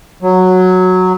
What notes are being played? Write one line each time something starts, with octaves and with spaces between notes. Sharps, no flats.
F#3